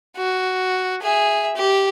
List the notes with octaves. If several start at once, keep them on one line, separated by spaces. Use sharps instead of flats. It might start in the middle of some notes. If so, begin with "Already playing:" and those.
F#4
G#4 E5
G4